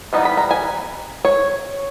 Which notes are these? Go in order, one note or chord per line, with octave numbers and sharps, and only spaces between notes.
E3 G3 B3 D#4
B5
A#5
G#5
C#5